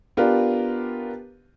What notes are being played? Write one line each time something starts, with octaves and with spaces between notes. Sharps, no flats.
B3 D4 F4 G4 A#4 B4